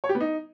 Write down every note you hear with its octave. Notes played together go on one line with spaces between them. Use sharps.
C#5
G4
B3
D#4